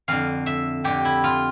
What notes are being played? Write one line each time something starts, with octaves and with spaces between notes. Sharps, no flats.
F2 D3 F5
E5
F2 D3 G4
E4
F4